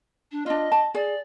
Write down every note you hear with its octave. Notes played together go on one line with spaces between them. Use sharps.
D4
D4 F4 D#5
A5
G#4 D5